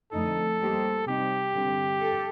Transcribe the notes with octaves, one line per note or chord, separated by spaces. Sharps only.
F2 D3 A3 D#4 A4
G3 A#3 D#4 G4 C5
C3 G3 C4 D#4 G4
G2 D3 G3 C4
A4